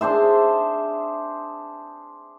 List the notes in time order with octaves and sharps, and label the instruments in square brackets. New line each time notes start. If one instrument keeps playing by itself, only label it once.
[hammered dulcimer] D4 G#4 C5 E5